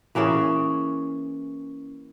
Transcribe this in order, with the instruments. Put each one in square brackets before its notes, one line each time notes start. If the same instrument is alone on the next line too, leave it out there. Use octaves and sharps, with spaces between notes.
[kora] E3 A#3 C#4 G#4